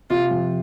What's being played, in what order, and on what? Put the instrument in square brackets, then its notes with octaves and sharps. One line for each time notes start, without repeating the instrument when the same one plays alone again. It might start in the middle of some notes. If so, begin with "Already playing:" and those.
[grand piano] C3 [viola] F4
[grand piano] F2